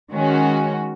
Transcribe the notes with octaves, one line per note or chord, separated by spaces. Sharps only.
D#3 G#3 C#4 F#4